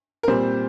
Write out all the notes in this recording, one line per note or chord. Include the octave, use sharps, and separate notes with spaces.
A#4
A#2 G3 C4 C5